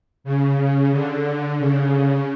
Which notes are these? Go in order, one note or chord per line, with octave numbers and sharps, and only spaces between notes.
C#3
C#3
D3
C#3